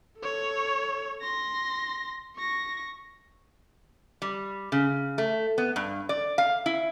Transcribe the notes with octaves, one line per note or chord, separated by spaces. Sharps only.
A4 C#5
C6 A#6
C#6 A#6
G3
C#3
A3
B3
G2
D5
F5
E4